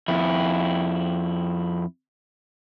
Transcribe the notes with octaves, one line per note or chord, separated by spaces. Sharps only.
F2 E4